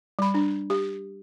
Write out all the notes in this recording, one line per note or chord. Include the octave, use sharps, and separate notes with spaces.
G3 B5
D4
G4